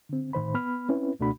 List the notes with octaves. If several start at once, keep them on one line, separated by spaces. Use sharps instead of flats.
D3 C4
A2 D#3 C5 B5
B3 B5 F6
C4 C#4 E4 B4
C#2 B2 A3 D4 F#4 B5